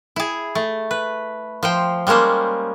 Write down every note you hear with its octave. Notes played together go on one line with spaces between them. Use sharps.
E4 G#4
A3
B4
F3 C5 G5
G3 G#3 A#3 C#4 C5